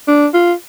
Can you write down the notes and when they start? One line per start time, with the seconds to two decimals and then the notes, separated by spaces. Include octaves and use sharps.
0.08 D4
0.34 F4